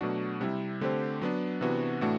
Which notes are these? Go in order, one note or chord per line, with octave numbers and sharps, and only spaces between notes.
B2 F#3 A3 D4 F#4
C3 G3 C4 E4
D3 A3 C4 G4 C5
F#3 B3 D4
C3 E3 B3 D4 F#4
A2 E3 A3 D4 F#4